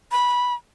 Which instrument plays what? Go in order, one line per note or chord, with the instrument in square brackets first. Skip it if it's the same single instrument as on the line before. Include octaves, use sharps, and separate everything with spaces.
[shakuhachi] B5